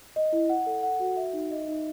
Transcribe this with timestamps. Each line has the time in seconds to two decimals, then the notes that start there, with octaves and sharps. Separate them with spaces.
0.16 D#5
0.33 E4
0.49 F#5
0.66 A4
0.83 F#5
1.00 F#4
1.17 E5
1.33 D#4
1.51 D#5
1.68 D#4